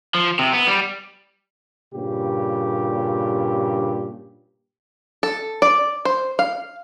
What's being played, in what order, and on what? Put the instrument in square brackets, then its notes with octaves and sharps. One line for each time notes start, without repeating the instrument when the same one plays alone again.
[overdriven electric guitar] F3
C3
B3
G3
[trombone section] G2 A#2 C#3 G4
[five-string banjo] A4
D5
C5
F5